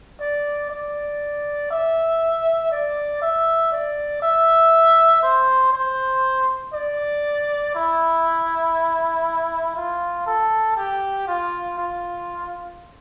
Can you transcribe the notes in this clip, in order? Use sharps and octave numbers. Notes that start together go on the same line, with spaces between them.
D5
D5
E5
D5
E5
D5
E5
C5
C5
D5
E4
F4
A4
G4
F4
F4